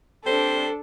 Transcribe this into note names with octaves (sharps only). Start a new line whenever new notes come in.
G3 C4 D4 A4 C5